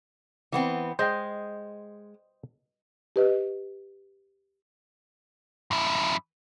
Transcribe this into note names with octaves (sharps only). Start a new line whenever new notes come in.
E3 B3 C4
G#3 C5 D#5 G5
G4 B4 D#5
F#2 E4